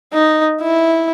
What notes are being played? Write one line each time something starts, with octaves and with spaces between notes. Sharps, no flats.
D#4
E4